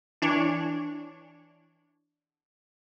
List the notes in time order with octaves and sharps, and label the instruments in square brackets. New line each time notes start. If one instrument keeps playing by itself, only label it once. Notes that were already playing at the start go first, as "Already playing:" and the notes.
[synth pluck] E3 D4 C#5